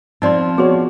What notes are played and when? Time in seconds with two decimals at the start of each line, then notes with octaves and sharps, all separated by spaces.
0.22 F3 C4 D#4 D5 C6
0.58 B3 F#4 G#4 C#5 C6